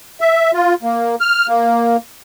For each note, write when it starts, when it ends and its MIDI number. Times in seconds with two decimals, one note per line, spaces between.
0.21 0.51 76
0.53 0.75 65
0.83 1.15 58
1.20 1.47 89
1.48 1.97 58